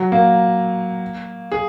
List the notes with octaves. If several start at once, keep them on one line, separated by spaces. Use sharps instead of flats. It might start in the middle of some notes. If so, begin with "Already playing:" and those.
Already playing: F#3
A#3
G#4